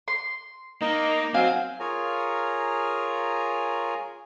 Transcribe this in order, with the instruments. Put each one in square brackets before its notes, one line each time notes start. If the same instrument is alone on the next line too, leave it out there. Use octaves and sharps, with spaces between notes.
[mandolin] C6
[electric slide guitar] A#3 [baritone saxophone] D#4 [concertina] D#5
[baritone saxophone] F#3 [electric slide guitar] C4 [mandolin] F5 [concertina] G#5
[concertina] F4 G#4 A#4 C#5 G#5 A#5